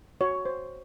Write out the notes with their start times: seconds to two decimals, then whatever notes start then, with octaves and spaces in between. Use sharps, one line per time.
0.21 F#4 C#5
0.45 C5